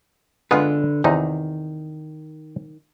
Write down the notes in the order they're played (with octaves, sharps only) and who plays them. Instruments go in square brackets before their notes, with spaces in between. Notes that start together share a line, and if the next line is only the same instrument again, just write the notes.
[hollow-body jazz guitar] D3 B4 [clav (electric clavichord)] G#3 B3 F4
[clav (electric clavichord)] E2 C3 D#4 [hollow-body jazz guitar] D#3